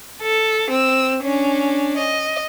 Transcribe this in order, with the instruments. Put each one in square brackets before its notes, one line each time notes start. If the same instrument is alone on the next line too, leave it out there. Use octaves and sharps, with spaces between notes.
[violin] A4
C4 E6
C#4 D4
D#5